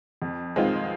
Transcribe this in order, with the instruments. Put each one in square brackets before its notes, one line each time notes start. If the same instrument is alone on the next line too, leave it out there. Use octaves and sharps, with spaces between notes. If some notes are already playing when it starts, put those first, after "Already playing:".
[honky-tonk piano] F2
D#3 G#3 C4 F4